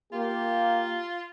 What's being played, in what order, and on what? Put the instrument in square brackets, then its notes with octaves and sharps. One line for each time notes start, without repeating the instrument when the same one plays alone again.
[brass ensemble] A#3 [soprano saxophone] F4 [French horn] G4